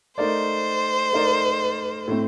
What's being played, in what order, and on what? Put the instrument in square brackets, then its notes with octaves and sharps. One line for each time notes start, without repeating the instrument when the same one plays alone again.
[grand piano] A3 D#4 A#4 D5 [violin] C5
[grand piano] A3 D#4 A#4 D5
A2 A3 C4